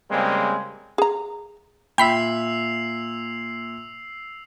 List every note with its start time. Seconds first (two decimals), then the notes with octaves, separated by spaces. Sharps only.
0.11 C#3 G3 G#3 A#3 C4
0.98 G#4 A#5
1.98 A#2 E5 G5 B5 E6 B6 C7 F7